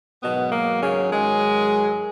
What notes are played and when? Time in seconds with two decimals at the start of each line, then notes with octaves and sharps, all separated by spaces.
0.22 G#2 B2 D#3 F#3 B3
0.52 A#3
0.81 C#3 C#4
1.11 G#2 D#3 F#3 G#3 G#4